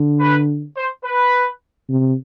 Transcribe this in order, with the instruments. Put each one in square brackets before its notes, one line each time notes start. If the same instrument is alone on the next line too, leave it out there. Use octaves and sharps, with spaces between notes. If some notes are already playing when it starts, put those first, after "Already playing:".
Already playing: [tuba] D3
[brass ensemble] B4
C5
B4
[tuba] C3